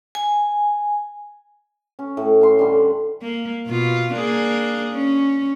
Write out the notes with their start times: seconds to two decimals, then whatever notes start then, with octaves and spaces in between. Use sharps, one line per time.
0.15 G#5
1.99 C#4
2.17 A2
2.41 C#4 C6
2.59 D3 G3
3.22 A#3
3.67 B2 F4
4.13 A#3 D4 G#4
4.93 C#4